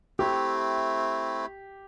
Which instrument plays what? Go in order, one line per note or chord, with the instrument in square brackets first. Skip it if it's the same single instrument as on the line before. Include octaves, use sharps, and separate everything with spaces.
[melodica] A3 C4 E4 [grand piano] G4